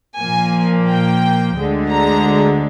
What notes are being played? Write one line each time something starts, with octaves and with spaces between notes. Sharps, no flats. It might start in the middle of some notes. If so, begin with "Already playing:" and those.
A#2 F3 A#3 G#5
G5
D2 D3 G#3
A#5